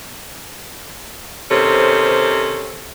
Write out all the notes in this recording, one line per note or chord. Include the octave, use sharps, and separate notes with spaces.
C3 D#3 C#4 A4 C5